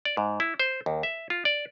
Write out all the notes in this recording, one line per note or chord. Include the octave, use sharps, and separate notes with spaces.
D5
G#2
E4
C5
D#2
E5
F4
D5